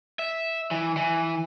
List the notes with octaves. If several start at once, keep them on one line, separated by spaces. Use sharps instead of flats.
E5
E3
E3